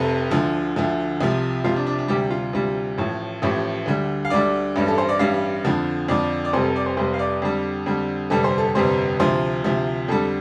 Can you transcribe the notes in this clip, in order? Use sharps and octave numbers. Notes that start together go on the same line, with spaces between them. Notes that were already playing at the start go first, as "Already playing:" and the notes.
Already playing: F1 F2 C3 A4
D2 D3 F3
D2 D3 F3
C2 C3 F3
C2 C3 F3 F4
D4
D4
D4
D2 C3 G3 G4
F4
D2 C3 G3
A1 A2 F3
A1 A2 F3 G4
D2 D3 G3
F5
D2 D3 G3 D5
A1 G2 G3
A4
C5
D5
A1 G2 G3 F5
F2 D3 F3
F2 D3 F3 D5
D5
F1 F2 C3 G3 C5
A4
D5
C5
F1 F2 C3 G3 C5
F5
D5
F2 D3 G3
F2 D3 G3
G1 F2 C3 G3 A4
C5
A4
G1 F2 C3 G3 C5
D2 C3 F3 C5
D2 C3 F3
F2 D3 G3 A4